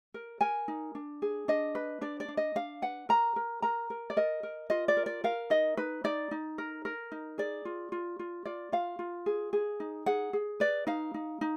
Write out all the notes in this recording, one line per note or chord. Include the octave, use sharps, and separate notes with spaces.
A#4
A#4 G#5
D#4
D4
G#4
D4 D#5
B4
D4 D5
D5
D4
D#5
D4 F5
B4 F#5
A#4 A#5
A#4
A#4 A#5
A#4
D5
A#4 D#5
A#4
F4 D#5
D5
A#4
D5
A#4 F5
D#4 D#5
D#4 B4
D#4 D5
D#4
A#4
A#4
D#4
G#4 D5
F4
F4
F4
F4 D5
F4 F5
F4
G#4
G#4
D#4
G#4 F#5
G#4
B4 D5
D#4 F5
D#4
D#4